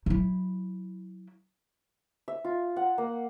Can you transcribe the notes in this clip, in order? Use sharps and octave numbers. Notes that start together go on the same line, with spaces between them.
F#3 E4
E5
F4
F#5
A#3